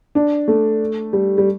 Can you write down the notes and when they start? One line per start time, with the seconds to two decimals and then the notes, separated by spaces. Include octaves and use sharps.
0.15 D4
0.48 A3
1.13 G3
1.38 G3